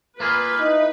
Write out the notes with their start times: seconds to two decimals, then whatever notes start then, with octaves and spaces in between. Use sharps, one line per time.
0.20 A#3 F4 G#4 B4
0.59 D#4 E4